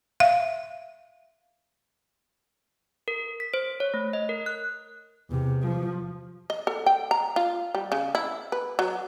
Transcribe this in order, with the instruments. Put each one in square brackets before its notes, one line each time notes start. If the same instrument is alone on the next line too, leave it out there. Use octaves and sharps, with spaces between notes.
[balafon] E5 F5
[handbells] A#4
B6
C5
C#5
A3
D#5
A#4
F#6
[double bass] E2 C3
F3
[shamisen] D#5
A4
G5
A#5
F4
G3
C#3
E4
B4
F#3